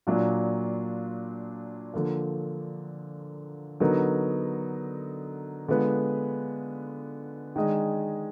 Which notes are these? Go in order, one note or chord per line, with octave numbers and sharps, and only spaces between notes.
A#2 F#3 D4 F4
D3 F3 A#3
D3 F#3 B3 D#4 A#4
D3 G#3 B3 F4 B4
D#3 G#3 D4 G#4 D#5